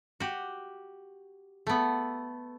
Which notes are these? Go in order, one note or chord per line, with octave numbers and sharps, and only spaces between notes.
F#4 G4
A3 B3